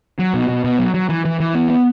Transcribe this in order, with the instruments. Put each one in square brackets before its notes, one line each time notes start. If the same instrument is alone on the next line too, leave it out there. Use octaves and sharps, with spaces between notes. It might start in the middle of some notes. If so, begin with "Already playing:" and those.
[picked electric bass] F#3
B2
B2
B2
F#3
F#3
E3
E3
E3
B3
B3